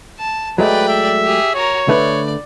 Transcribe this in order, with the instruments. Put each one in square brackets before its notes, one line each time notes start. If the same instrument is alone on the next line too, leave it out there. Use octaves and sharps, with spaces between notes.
[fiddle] A5
[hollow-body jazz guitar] F#3 G#3 A3 [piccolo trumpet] B4 [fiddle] D5 G5
[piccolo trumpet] E5
[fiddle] G4 G#4
[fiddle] F#4 A#4 [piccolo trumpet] C#5
[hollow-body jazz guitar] D3 A3 B4 [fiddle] D5